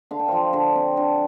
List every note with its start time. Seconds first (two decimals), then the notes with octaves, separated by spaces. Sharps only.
0.11 D3 F5
0.19 G5
0.28 F3 C5 F5
0.53 D3
0.75 C4
0.97 D3